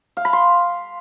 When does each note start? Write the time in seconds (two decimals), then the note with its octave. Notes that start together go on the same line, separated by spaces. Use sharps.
0.17 F5
0.25 B5
0.33 C6